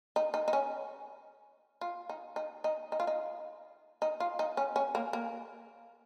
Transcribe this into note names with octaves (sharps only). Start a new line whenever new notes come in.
D#4
D#4
D#4
C#4
F4
D#4
D#4
D#4
D#4
F4
D#4
D#4
F4
D#4
C#4
C#4
A#3
A#3